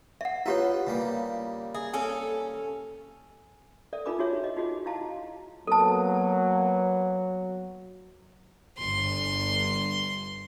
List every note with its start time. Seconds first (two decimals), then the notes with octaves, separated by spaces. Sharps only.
0.21 E5 F#5
0.46 B3 E4 F4 G4 C#5 E5
0.87 C#3 G3 A#3
1.74 G#4 E5
1.94 C#4 A4 G#5
3.93 A4 D5 E5
4.06 D#4 F4 A#4 G#5 B5 D6
4.19 D#4 F4 F#4 G#4 C#5 E5
4.44 D#5
4.57 D#4 F4 F#4 G#4 D#5
4.86 D#4 E4 F#4 F5 A5 A#5
5.67 F#3 A#3 B3 A4 A5
8.78 G1 C6